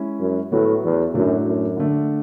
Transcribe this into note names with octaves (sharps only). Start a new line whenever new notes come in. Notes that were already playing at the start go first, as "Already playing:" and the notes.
Already playing: G#3 C#4 E4
F#2
A2 F#3 B3 F#4
E2
F#2 A2 F#3 A3 D4
F#2
D3 A3 D4